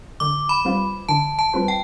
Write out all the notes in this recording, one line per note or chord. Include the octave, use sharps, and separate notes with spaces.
D3 D6
B5
G3 C4 F4 B4
D3 A5
A5
G3 C4 F4 B4
G5